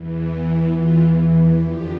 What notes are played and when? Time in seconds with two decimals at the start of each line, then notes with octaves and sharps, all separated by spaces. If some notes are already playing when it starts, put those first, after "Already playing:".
Already playing: E2 E3
0.74 E2 E3 F4
1.61 F2 D3 F3 G4